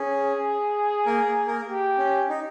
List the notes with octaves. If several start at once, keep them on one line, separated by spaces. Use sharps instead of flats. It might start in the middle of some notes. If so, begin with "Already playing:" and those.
Already playing: C#4 G#4
A#3 A#4
A#3 A#4
G4
C#4
D#4